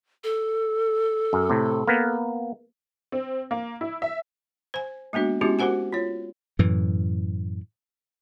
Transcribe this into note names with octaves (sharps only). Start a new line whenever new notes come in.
A4
F#2
A2 C3
A#3 B3
C4
A#3
E4
E5
C5 G#5
G#3 A#3 B3 D4 F#4
G#3 B3 C#4 E4 F#4 G4
F#4 G4 A#4 C5 F#5 G#5
F4 C#5
F#2 A2 E3